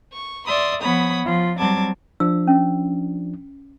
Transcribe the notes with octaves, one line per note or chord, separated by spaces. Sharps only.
C#6
D5 E5 C6 D#6
F3 B3 C#5 B5 D#6
F3 F4
F#3 G3 C4 A5 D6 G#6
F3 D4 E6
C#4